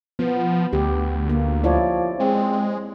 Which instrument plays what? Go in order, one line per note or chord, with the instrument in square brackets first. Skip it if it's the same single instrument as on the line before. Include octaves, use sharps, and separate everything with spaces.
[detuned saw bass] F3 [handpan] B3
[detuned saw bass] D2 [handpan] G4
[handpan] A#3
[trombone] F3 [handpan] E4 C#5 D5
[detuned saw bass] G#3 [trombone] C4